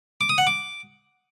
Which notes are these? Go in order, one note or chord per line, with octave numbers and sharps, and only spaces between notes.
D6
D#6
F#5
D6